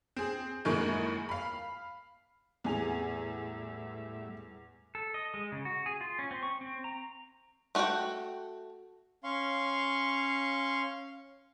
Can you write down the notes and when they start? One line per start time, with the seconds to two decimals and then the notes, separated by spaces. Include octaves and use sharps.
0.16 C4 G#4
0.65 F#2 A2 D#3 G#3 A#3
1.29 F5 B5
2.64 E2 A2 G3 B3 G#4 E5 G#5 F7
4.95 A4
5.14 D#5
5.34 G#3
5.52 C#3
5.65 F#4
5.86 G#4
6.01 F4
6.19 C#4
6.31 C4
6.43 C#6
6.61 C4
6.84 A#5
7.75 A3 F#4 D5 F#5 G5
9.24 C#4 F5 C6 C#6